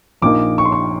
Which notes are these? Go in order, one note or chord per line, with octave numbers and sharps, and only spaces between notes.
A#1 A#2 F3 A#3 D#4 D6
C#6
C6
C#6